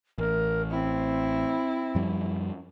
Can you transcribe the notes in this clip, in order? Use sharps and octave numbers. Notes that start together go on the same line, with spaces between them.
A1 A#4
C4 E4
F#2 F3 G3